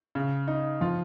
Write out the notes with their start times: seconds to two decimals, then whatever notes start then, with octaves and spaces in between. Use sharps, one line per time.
0.15 C#3
0.48 D#4
0.81 F3 F4